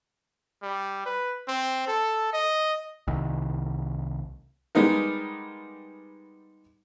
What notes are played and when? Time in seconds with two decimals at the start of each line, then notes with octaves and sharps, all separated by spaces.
0.62 G3
1.06 B4
1.48 C4
1.88 A4
2.33 D#5
3.08 C2 D#3
4.75 G3 G#3 B3 D#4 A#4